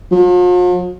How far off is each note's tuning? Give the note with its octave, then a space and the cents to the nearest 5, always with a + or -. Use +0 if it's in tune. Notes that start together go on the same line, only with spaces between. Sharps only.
F3 +45